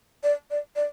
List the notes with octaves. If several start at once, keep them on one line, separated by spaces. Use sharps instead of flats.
D5
D5
D5